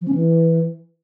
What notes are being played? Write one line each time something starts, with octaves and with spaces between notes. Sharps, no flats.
F3
C#4
E3